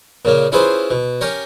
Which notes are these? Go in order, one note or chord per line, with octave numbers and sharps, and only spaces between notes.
A#2 C#3 A#3
C#4 E4 F4 G#4 B4 C5
B2
C#4 G4 A#4 C#5